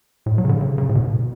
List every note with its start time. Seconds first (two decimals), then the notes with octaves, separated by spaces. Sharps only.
0.26 A2
0.38 F#3
0.45 C#3
0.49 D3
0.61 C#3
0.78 C#3
0.89 A2
0.95 B2